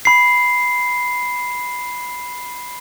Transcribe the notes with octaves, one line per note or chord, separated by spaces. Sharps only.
B5 C7